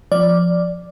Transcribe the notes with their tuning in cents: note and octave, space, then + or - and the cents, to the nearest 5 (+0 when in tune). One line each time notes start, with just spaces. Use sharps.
F3 +0 D5 +0